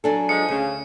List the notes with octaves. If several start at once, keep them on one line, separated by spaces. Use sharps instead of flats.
F#3 D4 A4 G#5
F3 G#3 C#7
D2 C#3